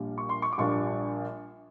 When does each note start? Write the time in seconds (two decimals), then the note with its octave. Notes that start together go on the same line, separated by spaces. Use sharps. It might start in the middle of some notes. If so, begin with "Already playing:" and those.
Already playing: A#1 A#2 G3 A#3 D4
0.18 C#6
0.29 C6
0.42 C#6
0.53 D6
0.58 A#1 A#2 G3 A#3 D4 C#6